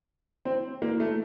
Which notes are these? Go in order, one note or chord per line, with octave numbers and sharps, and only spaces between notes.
C4
A#3
A3